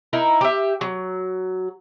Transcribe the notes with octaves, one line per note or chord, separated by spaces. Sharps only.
D#4 E4 A#4
G4 E5
F#3